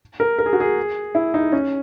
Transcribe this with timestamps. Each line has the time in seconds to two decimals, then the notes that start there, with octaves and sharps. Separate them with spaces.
0.20 A#4
0.39 A#4
0.46 G#4
0.53 F#4
0.60 G#4
1.15 E4
1.34 D#4
1.52 C#4